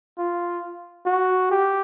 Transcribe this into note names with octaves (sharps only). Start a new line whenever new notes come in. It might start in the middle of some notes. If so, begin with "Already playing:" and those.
F4
F#4
G4